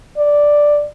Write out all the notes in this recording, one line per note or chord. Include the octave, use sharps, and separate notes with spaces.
D5